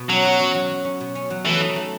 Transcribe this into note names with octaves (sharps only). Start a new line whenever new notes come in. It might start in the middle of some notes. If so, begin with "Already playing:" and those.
Already playing: B2
F#3 C#4
F#4
C#4
F#3
F#3
C#4
B2
C#4
F#3
E3 A3
D#4
A3